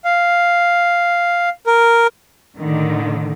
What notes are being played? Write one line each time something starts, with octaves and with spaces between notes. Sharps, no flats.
F5
A#4
A2 D3 D#3